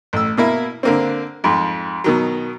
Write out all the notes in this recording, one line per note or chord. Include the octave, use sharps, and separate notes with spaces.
A1 E6
B2 A#3 E4
D3 A#3 C4
F2 G#2
B2 D#3 F#3